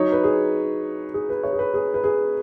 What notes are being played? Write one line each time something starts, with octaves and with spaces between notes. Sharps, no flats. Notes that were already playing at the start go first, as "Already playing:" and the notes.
Already playing: F#3 D#4 C#5
B4
G#4
G#4
B4
C#5
G#4
B4
G#4
B4
G#4